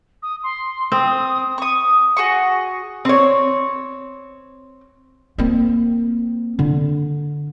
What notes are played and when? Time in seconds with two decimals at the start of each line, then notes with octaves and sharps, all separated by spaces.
0.22 D#6
0.43 C6
0.92 C4 D#6
1.58 C#6 D#6
2.17 F#4 G#4 C#6
3.05 C4 C#5
5.38 A#3 C4
6.59 D3